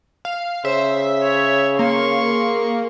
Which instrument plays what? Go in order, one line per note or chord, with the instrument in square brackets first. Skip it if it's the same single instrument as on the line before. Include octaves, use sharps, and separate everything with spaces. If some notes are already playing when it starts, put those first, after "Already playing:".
[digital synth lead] F5
[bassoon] C#3 [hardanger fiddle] C5 [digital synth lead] E5
[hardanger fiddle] C#5
[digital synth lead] A#3 [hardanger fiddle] C6 C#6
[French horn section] G#4 A#4